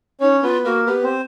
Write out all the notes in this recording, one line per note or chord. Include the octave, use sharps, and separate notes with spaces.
C#4 D#4 C#5
B3 F4 B4
A#3 F#4 A#4
B3 G4 B4
C4 C5